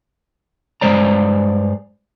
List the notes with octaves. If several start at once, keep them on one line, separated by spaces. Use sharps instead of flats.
G2 C#3 G#3 C5 D5 A#5